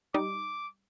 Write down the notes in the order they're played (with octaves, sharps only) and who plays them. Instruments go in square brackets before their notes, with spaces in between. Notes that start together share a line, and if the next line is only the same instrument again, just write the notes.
[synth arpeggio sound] G3 D#4 [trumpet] D6